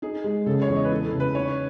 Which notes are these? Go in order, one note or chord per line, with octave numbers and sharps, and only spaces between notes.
D#4 G#4
G#3
C#3 A4
C#5
E2
D#5
B4
E3 A4
A4
C#3
B4
D#4 C#5